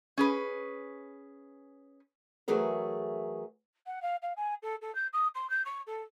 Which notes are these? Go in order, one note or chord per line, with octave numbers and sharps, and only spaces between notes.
C#4 G#4 B4
E3 F#3 A3 G#4 A#4
F#5
F5
F5
G#5
A4
A4
G6
D#6
C6
G6
C#6
A4